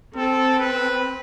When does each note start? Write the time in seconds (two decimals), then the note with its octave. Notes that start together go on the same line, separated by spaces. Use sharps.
0.16 C4 A4
0.59 B4